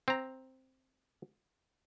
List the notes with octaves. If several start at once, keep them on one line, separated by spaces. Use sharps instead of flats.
C4 A#5